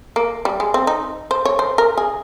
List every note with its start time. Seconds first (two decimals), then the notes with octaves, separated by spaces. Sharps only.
0.16 A#3
0.45 G3
0.60 G#3
0.74 C4
0.87 D#4
1.31 C5
1.45 C#5
1.59 C5
1.78 A#4
1.98 G#4